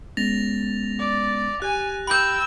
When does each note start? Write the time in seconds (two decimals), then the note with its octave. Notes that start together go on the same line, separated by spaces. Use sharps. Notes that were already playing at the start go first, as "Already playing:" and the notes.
0.17 G#3 B3 C#4 A6 A#6 F7
0.99 D5
1.62 G4 G#5 F#6
2.07 G5 B5 E6 G6